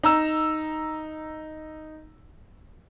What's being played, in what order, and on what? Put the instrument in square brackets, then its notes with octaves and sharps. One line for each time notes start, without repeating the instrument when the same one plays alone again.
[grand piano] D#4 A#5 E6